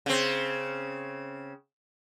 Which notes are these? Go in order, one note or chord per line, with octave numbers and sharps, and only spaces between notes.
C#3 C4